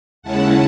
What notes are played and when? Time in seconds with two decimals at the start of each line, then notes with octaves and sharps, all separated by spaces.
0.22 D#2 C#3 G#3 C#4 E4 F#5 A5